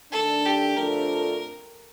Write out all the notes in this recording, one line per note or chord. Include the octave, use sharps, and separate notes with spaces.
D#3 A3 D4 A4
G4
F2 D3 F3 A3 D4 A#4